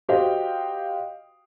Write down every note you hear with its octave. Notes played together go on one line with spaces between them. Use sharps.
F#4 G4 C5 D#5 F5 G5